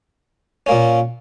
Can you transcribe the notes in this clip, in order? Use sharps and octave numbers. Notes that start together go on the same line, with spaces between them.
A#2 A#3 C#4